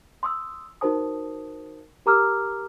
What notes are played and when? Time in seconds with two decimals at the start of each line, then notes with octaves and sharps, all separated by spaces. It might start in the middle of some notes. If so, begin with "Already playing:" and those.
0.23 C6 D#6 E6
0.81 D#4 F#4 A#4 C5 A5 D#6
2.06 G4 A#4 A#5 D6 E6 F6